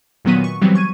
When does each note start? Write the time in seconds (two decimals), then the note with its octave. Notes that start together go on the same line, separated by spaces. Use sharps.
0.25 A#2 D#3 F#3 B3 B6 D#7
0.44 C#6
0.61 E3 F#3 G3 B3 C4
0.75 C#6 G#6 D#7